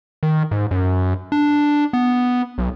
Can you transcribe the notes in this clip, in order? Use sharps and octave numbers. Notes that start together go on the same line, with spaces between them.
D#3
G#2
F#2
D4
B3
B1